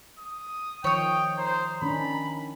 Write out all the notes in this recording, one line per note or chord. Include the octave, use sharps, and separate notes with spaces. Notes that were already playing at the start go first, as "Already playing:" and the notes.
D#6
D#3 F3 C#5 G5 D#6
C5 A#5
D#3 C#4 D4 B5